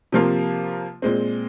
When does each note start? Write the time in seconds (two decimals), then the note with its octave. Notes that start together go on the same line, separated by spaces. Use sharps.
0.12 C3 F3 A#3 F4
1.02 A#2 G#3 C4